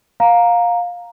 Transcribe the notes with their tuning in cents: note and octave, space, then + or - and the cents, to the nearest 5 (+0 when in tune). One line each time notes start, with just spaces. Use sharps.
F5 +15 A#5 +0